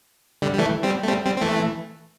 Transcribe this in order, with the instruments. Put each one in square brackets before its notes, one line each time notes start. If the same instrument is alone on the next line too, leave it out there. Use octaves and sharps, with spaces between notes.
[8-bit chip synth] D3 G3
G3
E3 A3
G3 C4
A3
G3 C4
G3 C4
C4
E3 A3